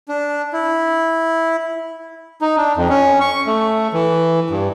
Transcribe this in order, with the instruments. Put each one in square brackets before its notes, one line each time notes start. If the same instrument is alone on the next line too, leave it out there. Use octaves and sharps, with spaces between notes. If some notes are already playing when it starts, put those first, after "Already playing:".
[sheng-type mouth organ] D4
E4
[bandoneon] D#4
D4
F2
C#4
C#6
A3
E3
G2